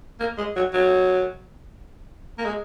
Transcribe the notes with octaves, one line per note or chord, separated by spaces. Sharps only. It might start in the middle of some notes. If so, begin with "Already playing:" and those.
A#3
G#3
F#3
F#3
A#3
G#3